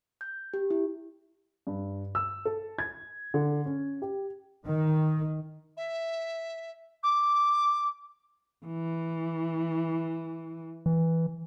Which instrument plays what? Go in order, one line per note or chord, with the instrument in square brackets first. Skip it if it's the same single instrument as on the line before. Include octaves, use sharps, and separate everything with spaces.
[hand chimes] G6
G4
E4
[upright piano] G2
E6
A4
G#6
D3
C#4
G4
[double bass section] D#3
[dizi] E5
D6
[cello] E3
[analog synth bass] E3